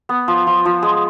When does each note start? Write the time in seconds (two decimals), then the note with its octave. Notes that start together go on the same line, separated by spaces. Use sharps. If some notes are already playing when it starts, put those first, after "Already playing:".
0.09 B3
0.28 F3
0.47 F3
0.65 F3
0.83 G#3